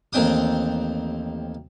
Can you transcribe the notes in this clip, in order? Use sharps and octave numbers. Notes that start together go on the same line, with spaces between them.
A1 D#2 C4 G5 D#6